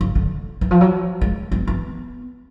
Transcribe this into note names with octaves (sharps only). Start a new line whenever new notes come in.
C#3
D3
E3
F3
F#3
G#3
B3
B3